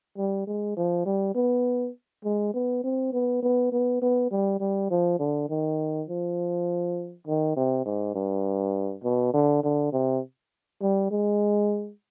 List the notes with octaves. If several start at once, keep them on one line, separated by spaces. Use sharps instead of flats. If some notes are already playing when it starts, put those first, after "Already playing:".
G3
G#3
F3
G3
B3
G#3
B3
C4
B3
B3
B3
B3
G3
G3
F3
D3
D#3
F3
D#3
C3
G#2
G2
B2
D3
D3
C3
G3
G#3